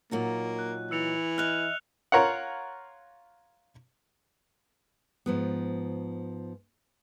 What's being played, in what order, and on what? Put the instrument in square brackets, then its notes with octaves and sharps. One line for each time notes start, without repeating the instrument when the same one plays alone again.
[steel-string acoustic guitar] A#2 F#3 D#4 [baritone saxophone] A#3
[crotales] F#6
[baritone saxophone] E3 [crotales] E6 C#7 F7
[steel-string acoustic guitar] D#5 E5 [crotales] F6 F#6 F7
[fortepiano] F4 A#4 C#5 F5 F#5
[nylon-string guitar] G#2 F3 B3